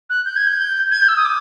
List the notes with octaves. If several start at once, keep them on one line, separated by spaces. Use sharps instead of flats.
F#6
G6
G#6
G6
G#6
G6
E6
D#6
D6